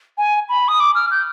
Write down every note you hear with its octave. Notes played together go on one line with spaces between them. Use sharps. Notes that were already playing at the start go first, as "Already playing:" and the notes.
G#5
B5
D#6
D6
F6
G6